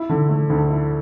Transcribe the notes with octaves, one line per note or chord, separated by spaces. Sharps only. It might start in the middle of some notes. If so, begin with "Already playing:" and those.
Already playing: E4
D3
A3
D2
E4